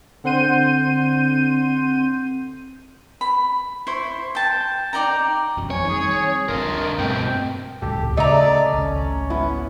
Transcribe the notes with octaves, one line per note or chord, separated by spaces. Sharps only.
D3 C4 F#5 C6 G6 D#7
B5
E4 C5 C6 C#6
G5 A5
D#4 D5 G5 A#5
E1 F#2 F#3
A1 F2 C#5 G#5
D#3 G3 C4 G#4
F1 C2 D3 F4 A#4
G2 B2 A3 C4 G5
D#1 C#2 A2 G4 A4
C#3 A3 D5 D#5 A#5
G#1 C#2 C#4
B3 E4